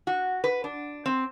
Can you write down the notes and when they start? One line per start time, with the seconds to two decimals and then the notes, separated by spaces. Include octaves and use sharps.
0.07 F#4
0.44 B4
0.64 D4
1.06 C4